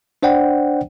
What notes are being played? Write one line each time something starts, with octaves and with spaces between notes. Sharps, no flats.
D4 C5 D5 F#5 G5